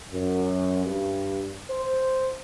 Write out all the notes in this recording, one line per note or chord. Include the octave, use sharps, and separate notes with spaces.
F#2
G2
C5